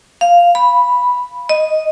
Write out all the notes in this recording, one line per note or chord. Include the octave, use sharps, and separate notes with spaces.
F5
B5
D#5